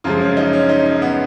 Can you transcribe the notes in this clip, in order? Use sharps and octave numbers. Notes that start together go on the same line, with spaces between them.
F#2 C#3 F3 G#3 F4
C#4
D#4
C#4
D#4
C#4
B3